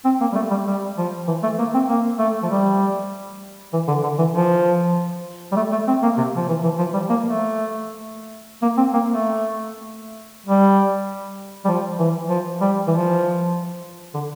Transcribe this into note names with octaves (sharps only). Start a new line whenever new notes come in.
C4
A#3
G3
A3
G3
G3
F3
E3
A3
A#3
C4
A#3
A3
F3
G3
E3
D3
D3
E3
F3
G3
A3
A3
C4
A#3
C3
F3
E3
E3
F3
G3
A#3
A3
A#3
C4
A#3
A3
G3
G3
F3
E3
F3
G3
E3
F3
D3